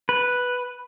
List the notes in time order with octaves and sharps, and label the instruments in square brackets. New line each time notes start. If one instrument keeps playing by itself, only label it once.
[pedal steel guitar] B4